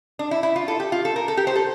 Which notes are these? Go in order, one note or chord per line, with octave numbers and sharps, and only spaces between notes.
D4
E4
E4
F4
A4
G4
F4
A4
A#4
A4
G4
C5
A4